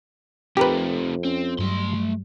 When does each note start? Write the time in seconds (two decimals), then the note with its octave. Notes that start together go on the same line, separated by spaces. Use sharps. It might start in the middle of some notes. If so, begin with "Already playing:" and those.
0.57 F2 C3 A3 D#4 G4 A#4 B4
1.25 C4 C#4
1.59 G2 F#3 G3 A3 C6